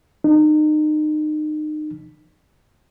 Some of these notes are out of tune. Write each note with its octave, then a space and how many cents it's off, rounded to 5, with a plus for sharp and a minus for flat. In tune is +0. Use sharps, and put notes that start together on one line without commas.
D#4 -30